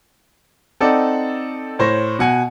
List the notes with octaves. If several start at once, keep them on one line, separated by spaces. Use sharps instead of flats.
C4 D#4 A4 D5 F#5
A2 C5 C#5 A#6
B2 F#5 G#5